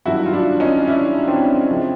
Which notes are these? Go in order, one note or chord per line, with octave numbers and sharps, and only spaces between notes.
G2 D#3 F#3 E4 F#4
F4
D4 E4
C#4 D#4
D4 E4
C4 D4
F2 C#3 F3